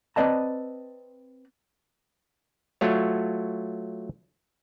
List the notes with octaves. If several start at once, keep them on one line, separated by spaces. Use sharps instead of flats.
C4 B4 D5 D#5 A5 A#5
F#3 A3 F4 C#5